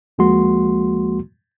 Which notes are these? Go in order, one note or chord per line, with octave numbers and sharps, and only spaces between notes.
D#2 F3 G#3 A#3 F#4 C6